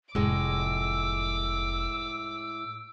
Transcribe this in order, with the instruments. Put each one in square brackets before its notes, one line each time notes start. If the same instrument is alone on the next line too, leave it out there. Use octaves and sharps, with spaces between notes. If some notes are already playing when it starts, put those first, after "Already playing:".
[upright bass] F1 [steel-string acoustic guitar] A2 G#3 [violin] D6 [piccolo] E6